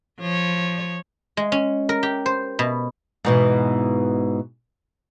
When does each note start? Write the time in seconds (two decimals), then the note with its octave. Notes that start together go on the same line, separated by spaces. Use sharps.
0.20 F3 C#5
1.37 G#3
1.52 C#4
1.89 A#4
2.03 G4
2.26 C5
2.59 B2
3.25 G#2 B2 E3